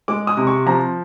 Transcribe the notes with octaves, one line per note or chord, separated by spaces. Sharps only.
G#3 D6
D#6
C3
C#6
F3 A#5